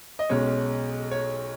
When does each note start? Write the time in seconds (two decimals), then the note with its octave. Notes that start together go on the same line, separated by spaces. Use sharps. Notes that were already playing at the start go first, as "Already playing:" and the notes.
0.19 D#5
0.29 B1 B2 G#3 C#4 C#5
1.11 C#5